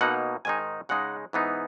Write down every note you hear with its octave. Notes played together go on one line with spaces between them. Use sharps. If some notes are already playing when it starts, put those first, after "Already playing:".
B2 A#3 D#4 F#5
G#2 D#3 G#3 D#4 G#5
C#3 G#3 D#4 F#5
G#2 E3 B3 D#4